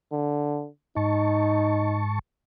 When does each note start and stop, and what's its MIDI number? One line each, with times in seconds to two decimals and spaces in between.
0.12 0.68 50
0.97 2.19 44
0.97 2.03 63
0.97 2.19 81
0.97 2.19 85